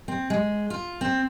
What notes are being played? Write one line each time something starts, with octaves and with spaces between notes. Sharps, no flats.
C4
G#3
F4
C4